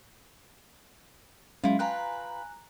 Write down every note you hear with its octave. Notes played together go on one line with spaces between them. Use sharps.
F#3 G#3 C#4 E4 F4
F4 B4 G5 G#5 A#5 F#6